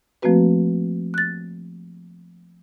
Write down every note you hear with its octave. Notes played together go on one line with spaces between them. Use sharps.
F3 A3 A#3 C4 F#4 B4
F#6 A6